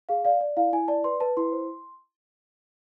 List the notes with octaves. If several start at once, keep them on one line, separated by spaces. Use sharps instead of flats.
G#4 F5
D5 F5
D5
E4 F5
E4 G#5
D5 A5
B4 C6
B4 A5
E4 C6
C5